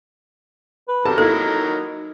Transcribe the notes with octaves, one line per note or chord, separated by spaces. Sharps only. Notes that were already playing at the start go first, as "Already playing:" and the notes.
B4
D#3 F#3 G4 A4 A#4 A5
A#3 D#4 E4 A4